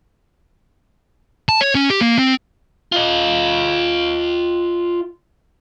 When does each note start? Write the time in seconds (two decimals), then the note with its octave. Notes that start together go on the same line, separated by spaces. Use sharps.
1.49 A5
1.61 C#5
1.75 C#4
1.90 G4
2.01 A#3
2.19 C4
2.92 F4 D#5